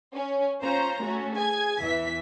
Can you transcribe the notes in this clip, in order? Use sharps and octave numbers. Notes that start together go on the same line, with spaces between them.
C#4
C#4 F4 C5 A#5
A3 C#4 F#4
G#4 G#5 G#6
E2 E3 E5 B6